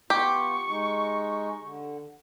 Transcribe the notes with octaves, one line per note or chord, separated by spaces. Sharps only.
B3 F4 G4 C#6
G#3 D#4
D3